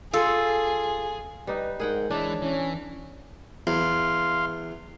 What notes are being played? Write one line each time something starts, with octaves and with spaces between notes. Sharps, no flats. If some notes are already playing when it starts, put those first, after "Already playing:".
F4 G#4 A4
G3 D#4 B4
G#2 G#4 A#4 F#5 G5
E3 G#3 D4 C#5
E3 C#4
E2 F5 C6